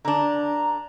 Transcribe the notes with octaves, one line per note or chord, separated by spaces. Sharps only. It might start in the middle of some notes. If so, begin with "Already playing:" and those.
D3 D4 A#5